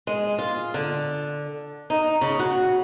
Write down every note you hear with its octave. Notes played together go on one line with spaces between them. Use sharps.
G#3
F4
D3
D#4
C#3
F#4